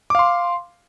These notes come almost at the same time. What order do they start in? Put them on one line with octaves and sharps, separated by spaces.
D6 F5 C6